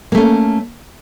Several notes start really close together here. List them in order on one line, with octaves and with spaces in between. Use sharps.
A#3 A3 C#4